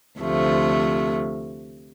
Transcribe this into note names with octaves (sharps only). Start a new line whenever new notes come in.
D2 C3 F3 A3